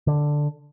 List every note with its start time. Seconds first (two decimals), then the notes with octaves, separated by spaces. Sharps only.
0.07 D3